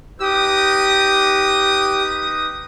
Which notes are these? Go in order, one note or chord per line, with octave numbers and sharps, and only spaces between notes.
D#4 G4 B4 D#6